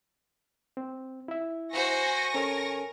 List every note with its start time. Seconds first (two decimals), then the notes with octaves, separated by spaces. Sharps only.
0.77 C4
1.28 E4 E5
1.73 F#4 C5 G#5 C#6 A#6
2.35 C#4 A4 A#4 C#5